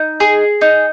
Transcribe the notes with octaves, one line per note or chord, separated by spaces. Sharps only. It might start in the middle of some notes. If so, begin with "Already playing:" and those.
Already playing: D#4
G#4
D#4